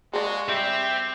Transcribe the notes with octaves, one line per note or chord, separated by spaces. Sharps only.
G#3 F#4 G#4 D5 F5
G3 C4 G4 E5